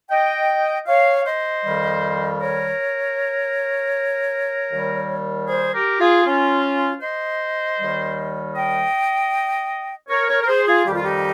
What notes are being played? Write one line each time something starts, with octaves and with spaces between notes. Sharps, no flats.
D#5 G5
C#5 F5
C5 D#5
F2 D#3 G3
A#4 C#5
D#2 D#3 G3
G#4 C5
G4 A#4
F4 G#4
C#4 F4
C5 D#5
D#2 D#3 G3
D#5 G5
A#4 C#5
A#4 C#5
A#4
G#4 C5
F4 G#4
F2 D#3 G3 G4
F4
D#4 G4